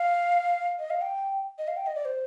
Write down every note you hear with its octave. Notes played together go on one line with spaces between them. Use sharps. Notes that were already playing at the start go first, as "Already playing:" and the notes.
Already playing: F5
D#5
F5
G5
D#5
F5
G5
D#5
D5
C5